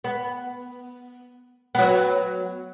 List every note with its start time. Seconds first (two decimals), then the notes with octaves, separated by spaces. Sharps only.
0.04 B3
1.75 F#3 B3